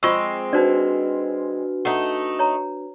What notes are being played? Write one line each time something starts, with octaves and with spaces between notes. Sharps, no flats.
G#3 C4 F4 C#6 E6 C7
D4 D#4 F#4 B4 C5 D5
A3 D#4 F#5
C#5 A#5